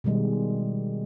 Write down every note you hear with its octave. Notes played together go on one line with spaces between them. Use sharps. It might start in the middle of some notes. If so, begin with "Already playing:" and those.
B2 D#3 G3 G#3